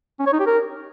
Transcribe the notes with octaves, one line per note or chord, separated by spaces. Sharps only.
C#4
C#5
D#4
G4
A#4